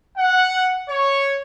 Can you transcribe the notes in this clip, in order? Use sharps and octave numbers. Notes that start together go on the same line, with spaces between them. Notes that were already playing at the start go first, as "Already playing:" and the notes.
F#5
C#5